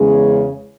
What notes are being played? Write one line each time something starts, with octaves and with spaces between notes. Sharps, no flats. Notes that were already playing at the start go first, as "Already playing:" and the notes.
Already playing: E2 C#3 G#3 C#4 G#4